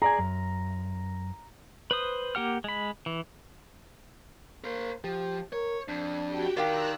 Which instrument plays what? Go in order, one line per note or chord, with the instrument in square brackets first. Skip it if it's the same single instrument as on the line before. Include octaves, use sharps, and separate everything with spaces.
[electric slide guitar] G#4 D5 G#5 [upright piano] A#5
[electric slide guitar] F#2
[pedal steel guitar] B4 C5 D#6
A#3 G4 F#5 F6
G#3 B5
E3
[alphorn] A#3 [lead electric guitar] A#4 C5
[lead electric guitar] F3 [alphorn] G4
[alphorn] A#4 [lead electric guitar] C#5
[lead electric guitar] F2 [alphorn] D4
[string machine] F#4 G4 G5
[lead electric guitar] D#3 [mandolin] D4 F4 G4 [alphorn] A#4 [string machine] A#5 E6 F#6